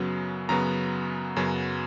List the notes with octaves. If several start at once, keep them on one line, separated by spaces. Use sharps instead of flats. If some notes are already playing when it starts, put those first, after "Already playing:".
Already playing: F#2 C#3 F#3 B3
F#2 C#3 F#3 B3 A#5
F#2 C#3 F#3 B3